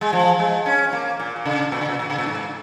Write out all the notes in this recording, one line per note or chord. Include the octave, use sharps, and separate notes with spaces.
G#3
F3
G#3
C#4
A#3
A#2
A#2
C#3
A#2
C#3
A#2
A#2
C#3
A#2
G#2